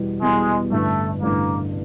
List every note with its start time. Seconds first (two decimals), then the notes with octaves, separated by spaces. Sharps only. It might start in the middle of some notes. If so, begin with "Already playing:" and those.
Already playing: E2 B2 G3
0.22 E2 B2 G3 G#3
0.71 A1 G2 D3 A3
1.22 A1 G2 D3 A#3